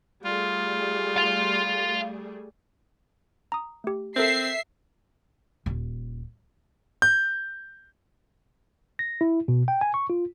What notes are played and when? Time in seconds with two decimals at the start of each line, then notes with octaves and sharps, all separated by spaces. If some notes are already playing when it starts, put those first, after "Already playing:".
0.24 G3 A3 F4 G#4
1.16 F5 C6
3.52 A#5 D#6
3.84 A3 G4
4.16 C4 A4 A#4 C5 E5 C7
5.66 D#1
7.02 G6
8.99 A#6
9.21 E4
9.48 B2
9.68 G5
9.81 G#5
9.94 C#6
10.10 F4